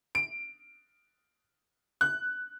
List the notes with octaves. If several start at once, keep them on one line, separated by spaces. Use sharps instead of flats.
D7
F#6